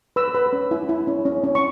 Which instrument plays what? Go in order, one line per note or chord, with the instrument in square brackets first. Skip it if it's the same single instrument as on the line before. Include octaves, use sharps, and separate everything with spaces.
[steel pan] B4 E6
B4
C#4
E4
E4
C#4
C#4
C#4
C#6